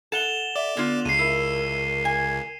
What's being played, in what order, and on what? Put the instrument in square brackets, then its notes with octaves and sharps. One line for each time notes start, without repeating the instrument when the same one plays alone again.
[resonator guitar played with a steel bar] A4 F#5 [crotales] E7 F7 G7
[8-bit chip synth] D5 [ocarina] E5
[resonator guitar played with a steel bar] D3 F4 [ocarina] B3
[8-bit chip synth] C#2 [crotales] C7 D#7
[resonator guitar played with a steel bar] E4 [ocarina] A#4
[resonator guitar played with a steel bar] G#5